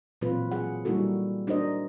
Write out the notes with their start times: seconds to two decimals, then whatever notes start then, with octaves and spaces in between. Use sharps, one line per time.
0.22 A#2 E3 F#3 C4 F4 B4
0.52 F#3 G#4 F#5
0.85 G3 A#3 D#4 E4 F#4 A4
1.47 D4 D#4 F#4 A#4 C5 D#5